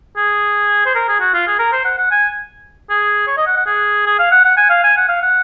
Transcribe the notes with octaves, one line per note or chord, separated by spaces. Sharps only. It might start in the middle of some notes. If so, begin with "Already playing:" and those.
G#4
C5
A#4
G#4
F#4
F4
G#4
A#4
C5
F#5
F#5
G#5
G#4
C#5
D#5
F#5
F#5
G#4
G#4
F5
F#5
F#5
G#5
F5
G#5
F#5
F5
F#5